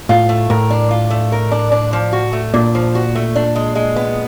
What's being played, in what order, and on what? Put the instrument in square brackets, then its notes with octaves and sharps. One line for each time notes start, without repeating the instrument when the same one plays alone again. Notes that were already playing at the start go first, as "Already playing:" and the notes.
[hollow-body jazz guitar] A2 [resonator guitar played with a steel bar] F4
[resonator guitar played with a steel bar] A3
[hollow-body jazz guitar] A2 [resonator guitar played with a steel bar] A#4
[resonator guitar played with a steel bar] D4
F4
A3
A#4
D4
D4
F3
F#4
A3
[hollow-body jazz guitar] A#2 [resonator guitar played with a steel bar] D4
[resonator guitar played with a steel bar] F3
F#4
A3
D4
G#3
G#3
B3